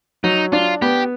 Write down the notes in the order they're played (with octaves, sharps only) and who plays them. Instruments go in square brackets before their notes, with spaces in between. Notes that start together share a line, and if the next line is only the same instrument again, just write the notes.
[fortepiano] F#3 [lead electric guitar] D#4
[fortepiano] D4 [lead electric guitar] F4
[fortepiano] B3 [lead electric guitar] G4